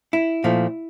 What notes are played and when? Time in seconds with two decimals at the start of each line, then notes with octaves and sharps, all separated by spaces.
0.13 E4
0.44 A#2 F3 A3